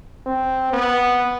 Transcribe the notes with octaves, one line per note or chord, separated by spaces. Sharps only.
C4
B3